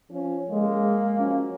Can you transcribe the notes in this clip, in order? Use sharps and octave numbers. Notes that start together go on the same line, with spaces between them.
F3 C#4
G#3 A#3
F3 F#3 C#4